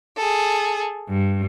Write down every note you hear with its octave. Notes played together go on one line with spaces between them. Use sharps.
G#4 A4
G2